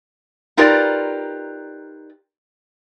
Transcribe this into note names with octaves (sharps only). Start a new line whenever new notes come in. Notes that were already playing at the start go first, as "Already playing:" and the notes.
D#4 F4 G4 A#4 B4 D5